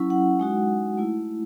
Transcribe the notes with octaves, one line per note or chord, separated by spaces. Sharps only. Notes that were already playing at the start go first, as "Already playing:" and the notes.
Already playing: F#3 C#4 E4
F#5
G#3 D#4 F#4
A3 E4